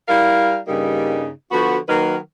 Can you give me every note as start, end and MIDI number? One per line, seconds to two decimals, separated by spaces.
0.07 0.57 55
0.07 0.57 64
0.07 0.57 70
0.07 0.57 77
0.68 1.28 43
0.68 1.28 49
0.68 1.28 55
0.68 1.28 58
0.68 1.28 63
1.51 1.77 50
1.51 1.77 53
1.51 1.77 59
1.51 1.77 66
1.88 2.16 51
1.88 2.16 54
1.88 2.16 58
1.88 2.16 63
1.88 2.16 70
1.88 2.16 71